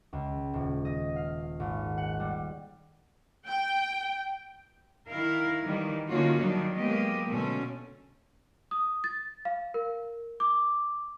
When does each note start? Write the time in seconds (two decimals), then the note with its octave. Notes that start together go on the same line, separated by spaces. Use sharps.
0.13 C#2
0.53 D#1
0.85 D#5
1.16 F5
1.60 G#1
1.98 F#5
2.20 G3
3.48 G5
5.08 D#3 E4 A#4 F5
5.63 D#3 E3 G3
6.08 D3 D#3 A#3 C#4 F4 F#4
6.38 D#3 F#3 G3 D4 D#4
6.75 F#3 G#3 A#3 B3 G4 D#5
7.27 B2 D3 A3 C#4
8.71 D#6
9.04 A6
9.45 F5
9.74 A#4
10.40 D6